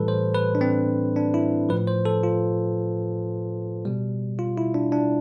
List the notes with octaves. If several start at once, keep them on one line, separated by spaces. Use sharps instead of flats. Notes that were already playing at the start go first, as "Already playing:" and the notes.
Already playing: A2 E3 G3 A4 B4
C5
B4
D4
C4
D4
E4
A2 F3 B4
C5
A4
F4
B2 G3
F4
E4
D4
D4